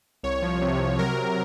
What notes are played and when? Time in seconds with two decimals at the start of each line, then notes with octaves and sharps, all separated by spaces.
0.23 C2 C#5
0.42 F3
0.62 C3
0.80 C3
0.99 F#3 A#4
1.17 F#3